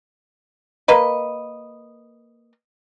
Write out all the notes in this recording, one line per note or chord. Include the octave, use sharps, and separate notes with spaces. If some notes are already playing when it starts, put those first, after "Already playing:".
A#3 B4 D#5